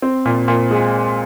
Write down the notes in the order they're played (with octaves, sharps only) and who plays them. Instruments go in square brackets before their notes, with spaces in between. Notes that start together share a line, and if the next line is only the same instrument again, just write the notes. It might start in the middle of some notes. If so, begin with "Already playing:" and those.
[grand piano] C4
A#2
A#2
G#3